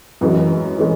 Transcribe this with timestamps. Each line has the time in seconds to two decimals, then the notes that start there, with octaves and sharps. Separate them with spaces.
0.21 F#2 E3 G#3
0.78 E3 G#3